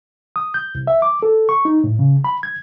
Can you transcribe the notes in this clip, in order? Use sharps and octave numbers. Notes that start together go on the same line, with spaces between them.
D#6
G6
C2
E5
D6
A4
C#6
D#4
A2
C#3
B5
G#6